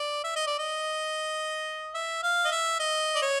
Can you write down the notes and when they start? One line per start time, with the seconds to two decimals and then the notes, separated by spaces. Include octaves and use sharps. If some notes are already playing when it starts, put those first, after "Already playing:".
Already playing: D5
0.24 E5
0.36 D#5
0.47 D5
0.58 D#5
1.95 E5
2.23 F5
2.45 D#5
2.52 E5
2.80 D#5
3.15 D5
3.22 C#5